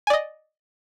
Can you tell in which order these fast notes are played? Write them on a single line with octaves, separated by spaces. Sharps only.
G#5 D5 D#5